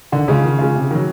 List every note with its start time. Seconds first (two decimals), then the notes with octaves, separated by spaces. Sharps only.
0.12 D3 D#3
0.28 C#3 G#3 C#4 F4
0.44 D#3
0.59 G#3 C#4 F4
0.75 C3
0.91 D#3 F#3